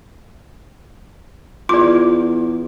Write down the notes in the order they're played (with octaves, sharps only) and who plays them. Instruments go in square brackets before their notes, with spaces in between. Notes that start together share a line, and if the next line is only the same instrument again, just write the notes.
[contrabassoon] E2 [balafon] F4 [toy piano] D5 D6